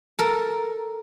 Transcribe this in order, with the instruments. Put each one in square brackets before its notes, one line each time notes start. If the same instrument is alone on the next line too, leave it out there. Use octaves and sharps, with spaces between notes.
[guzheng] A4 A#4